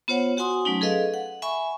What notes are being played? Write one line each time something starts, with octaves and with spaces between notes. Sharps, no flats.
B3 F4 C5 C#5 F#5
F#4 F#5 G#5 C6 D#6
F#3 A3 C#4 D#4
G#4 A4 B4 D#5 F5
F#5
E5 G#5 B5 C#6